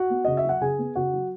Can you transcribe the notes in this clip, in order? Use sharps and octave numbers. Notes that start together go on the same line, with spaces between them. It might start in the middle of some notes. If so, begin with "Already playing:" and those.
Already playing: F#4 F#5
B3
C#3 D#5
E5
F#3 F#5
C#3 G#4 G#5
B3
C#3 F#4 F#5
F#3